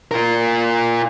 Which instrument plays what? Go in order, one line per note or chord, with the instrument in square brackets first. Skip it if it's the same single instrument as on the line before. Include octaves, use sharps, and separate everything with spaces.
[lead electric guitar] F4 A#4